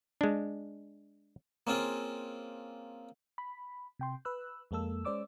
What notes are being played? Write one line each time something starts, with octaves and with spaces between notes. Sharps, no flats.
G#3 D4
A#3 C4 C#4 F4 G#4
B5
C3 G5 C6
B4 E6 F#6
F2 G#3 A#3 A4 E6
G#3 C#4 C5 D5 D6 E6